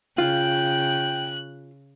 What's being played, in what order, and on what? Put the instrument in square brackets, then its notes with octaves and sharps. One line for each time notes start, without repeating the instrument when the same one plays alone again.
[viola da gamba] C#3 [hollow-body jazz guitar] F4 F5 [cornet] G5 [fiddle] F#6